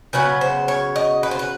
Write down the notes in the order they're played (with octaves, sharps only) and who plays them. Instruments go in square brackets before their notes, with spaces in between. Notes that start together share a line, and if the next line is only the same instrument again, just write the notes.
[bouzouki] C#3 F#3 B3 B4
C5
C#5
D#5
B4
C5
B4